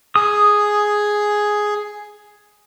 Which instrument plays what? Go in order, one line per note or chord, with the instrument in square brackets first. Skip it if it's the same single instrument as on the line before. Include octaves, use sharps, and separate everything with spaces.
[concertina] G#4 [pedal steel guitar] D#6